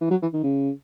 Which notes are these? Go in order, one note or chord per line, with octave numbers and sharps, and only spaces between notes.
E3
F#3
E3
D#3
C#3